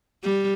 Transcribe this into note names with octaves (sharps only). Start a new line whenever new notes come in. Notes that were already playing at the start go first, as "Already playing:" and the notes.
G3